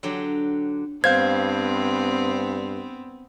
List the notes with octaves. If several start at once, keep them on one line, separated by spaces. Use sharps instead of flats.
D3 F#3 G4
G2 B3 C4 C5 F5 G6 G#6